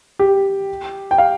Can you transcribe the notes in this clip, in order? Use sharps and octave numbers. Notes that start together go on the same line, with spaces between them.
G4
G5
F5